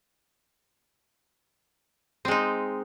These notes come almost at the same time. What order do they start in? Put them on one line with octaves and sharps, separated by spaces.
C4 G#3 D#4